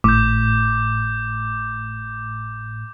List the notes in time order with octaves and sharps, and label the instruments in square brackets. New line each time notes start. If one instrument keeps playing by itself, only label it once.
[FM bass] G#1 [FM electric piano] A2 [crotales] D6 G6